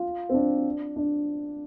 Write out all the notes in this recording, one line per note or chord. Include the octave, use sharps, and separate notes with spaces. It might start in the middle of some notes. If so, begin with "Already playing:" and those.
Already playing: F4
C4
D4
D4